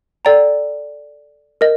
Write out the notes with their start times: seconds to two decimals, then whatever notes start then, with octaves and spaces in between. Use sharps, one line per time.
0.25 A4 D5 G5 A#5
1.61 A#4 D#5